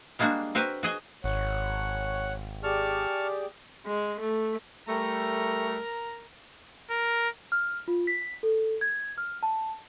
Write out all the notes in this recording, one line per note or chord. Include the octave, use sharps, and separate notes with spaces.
G3 G#3 A#3 D4 F#4
C4 F#4 A#4 B4
F#4 G#4 D#5
G#1 C#5 F#5
G4 G#4 D5 A5 C#6 F6
G#3
A3
G3 A3 A#4 A#5
A#4
F6
F4
B6
A4
G#6
F6
A5